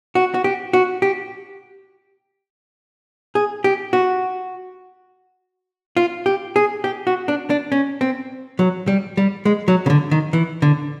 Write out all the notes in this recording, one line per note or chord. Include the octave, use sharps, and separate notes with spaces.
F#4
F#4
G4
F#4
G4
G#4
G4
F#4
F4
G4
G#4
G4
F#4
D4
D4
C#4
C4
F#3
G3
G3
G#3
F#3
C#3
D3
D#3
E3
D3